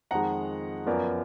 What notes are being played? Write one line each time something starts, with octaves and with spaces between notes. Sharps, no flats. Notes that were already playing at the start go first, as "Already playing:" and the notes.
F2 D#3 G#3 F#5 A#5
F#2 F3 B3 A#4 D5